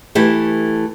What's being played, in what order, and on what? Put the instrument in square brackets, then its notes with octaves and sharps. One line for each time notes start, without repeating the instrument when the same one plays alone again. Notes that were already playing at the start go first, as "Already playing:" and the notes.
[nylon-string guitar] E3 A3 G4 A4